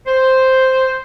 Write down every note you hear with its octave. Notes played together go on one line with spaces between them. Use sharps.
C5